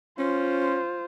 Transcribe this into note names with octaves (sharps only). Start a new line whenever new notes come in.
C#4 F4 C5